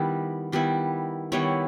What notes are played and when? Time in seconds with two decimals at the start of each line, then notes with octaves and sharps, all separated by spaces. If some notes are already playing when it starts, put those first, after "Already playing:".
Already playing: D#3 G3 B3 E4
0.52 D#3 G3 B3 E4
1.32 D#3 G3 B3 E4 C#5